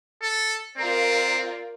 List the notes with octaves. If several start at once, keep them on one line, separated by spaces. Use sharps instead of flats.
A4
C4 F4 A#4 D5